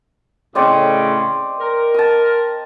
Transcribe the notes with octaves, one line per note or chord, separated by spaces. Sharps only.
A2 C#3 C4 D5 D#5
A#4
A5 D#6